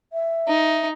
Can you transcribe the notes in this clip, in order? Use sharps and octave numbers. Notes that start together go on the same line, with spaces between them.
E5
D#4